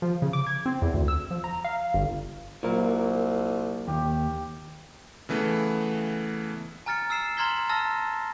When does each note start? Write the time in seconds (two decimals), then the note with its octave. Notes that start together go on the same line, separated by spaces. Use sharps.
0.02 F3
0.22 C#3
0.33 D6
0.47 G#6
0.66 C4
0.82 E2
0.94 D2
1.08 E6
1.31 F3
1.44 A#5
1.64 F5
1.94 G1
2.63 C2 A#2 F#3 F4 A#4
3.88 D#2 G4
5.29 C#3 E3 A3 B3
6.86 G#5 A#5 F6 A6 C#7
7.10 E6 F6 C7 E7
7.37 A#5 C6 F6 G#6 B6 G7
7.69 A5 A#5 E6 F6 A6 A#6